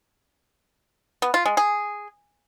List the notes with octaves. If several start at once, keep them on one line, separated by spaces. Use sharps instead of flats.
B3
F4
G#3
G#4